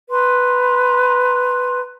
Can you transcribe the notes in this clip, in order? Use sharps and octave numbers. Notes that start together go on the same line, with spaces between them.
B4 A#5 C6